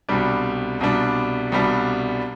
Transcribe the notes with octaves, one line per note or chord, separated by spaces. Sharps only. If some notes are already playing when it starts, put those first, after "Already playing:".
C2 B2 G3 D4
C2 B2 G3 D4
C2 B2 G3 D4